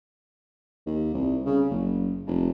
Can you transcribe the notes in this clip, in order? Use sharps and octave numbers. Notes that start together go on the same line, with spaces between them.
D#2
C2
C#3
F#1
F1